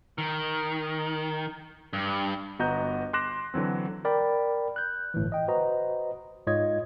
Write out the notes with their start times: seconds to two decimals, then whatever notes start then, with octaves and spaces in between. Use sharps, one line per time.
0.18 D#3
1.93 G2
2.59 G1 B3 F#4 D#5 A#5 G6
3.13 C6 D6 F#6 A#6 E7
3.54 D3 E3 F#3 C4
4.05 A#4 D5 G5 B5
4.76 F#6 G6
5.14 G1 A2 E3
5.32 D#5 G5
5.48 F#4 B4 C5 D#5 A#5
6.47 G#2 F4 C#5 D#5 G#6